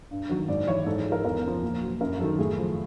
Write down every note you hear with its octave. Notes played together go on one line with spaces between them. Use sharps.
G2
D#3 F#3
G#2 D5
E3 C#5
G#2 A4
G#4
F3
A#4
E2 A#4
C#3 F3
A#2
F#3
F#2 A#4
D#3 F#3 A4
A2 G#4
F3